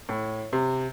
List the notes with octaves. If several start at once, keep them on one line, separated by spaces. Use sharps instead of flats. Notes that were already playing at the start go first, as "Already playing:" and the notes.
A2
C3